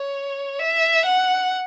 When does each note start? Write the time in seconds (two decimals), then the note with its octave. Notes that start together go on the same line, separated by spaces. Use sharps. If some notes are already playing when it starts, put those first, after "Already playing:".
Already playing: C#5
0.60 E5
1.06 F#5